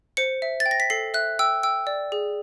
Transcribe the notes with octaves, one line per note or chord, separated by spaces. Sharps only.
C5 C#7
E5
A6
G5
A#6
B6
A4 C7
E5 F#6
G5 E6
G5 E6
D5
G#4